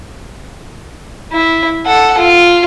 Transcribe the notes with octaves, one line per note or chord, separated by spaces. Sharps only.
E4
A4 F#5
F4